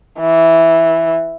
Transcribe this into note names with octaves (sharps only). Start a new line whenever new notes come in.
E3